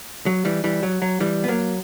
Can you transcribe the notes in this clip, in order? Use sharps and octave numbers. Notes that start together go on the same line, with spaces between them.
F#3
E3 G3
E3 G3
F#3
F#3
E3 G3
B3
F#3 A#3